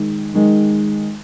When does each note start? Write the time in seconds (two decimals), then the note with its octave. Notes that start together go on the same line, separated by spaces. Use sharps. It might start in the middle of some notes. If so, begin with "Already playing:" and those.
Already playing: D#3 G#3
0.34 D#3 G#3